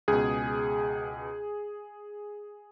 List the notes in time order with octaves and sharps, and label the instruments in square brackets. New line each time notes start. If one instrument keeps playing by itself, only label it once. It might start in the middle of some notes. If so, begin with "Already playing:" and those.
[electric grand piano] C#2 B2 G#4